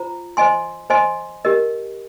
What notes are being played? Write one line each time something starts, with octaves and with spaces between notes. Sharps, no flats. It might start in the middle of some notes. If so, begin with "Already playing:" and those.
Already playing: F4 C5 A#5
C5 D#5 G#5 C6
C5 D#5 G#5 C6
G4 A#4 D#5